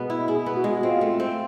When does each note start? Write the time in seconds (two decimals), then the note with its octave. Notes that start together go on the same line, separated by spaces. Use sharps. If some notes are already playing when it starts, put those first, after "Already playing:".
Already playing: B2 G#3 B3
0.10 E4
0.28 E4 G#4
0.46 B3
0.55 F#4
0.64 G#3
0.83 C4 F4
1.01 A3
1.20 C4